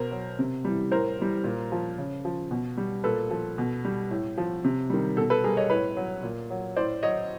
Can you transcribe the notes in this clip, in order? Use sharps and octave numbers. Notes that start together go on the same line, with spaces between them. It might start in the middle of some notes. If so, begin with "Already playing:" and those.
Already playing: B2 A#4 C5
F#3
C3
E3 G3
A2 A#4 C5
E3 G3
A#2
F3
C#3
F3
B2
G3
A#2 A4 B4
F3
B2
G3
A2
F3
C3
D#3 G3
B2 A4
A4 B4
G3 G#4 A#4
C#5 D#5
A2 B4 C#5
F#3
A#2
F#3
A2 C5 D5
F#3 C#5 D#5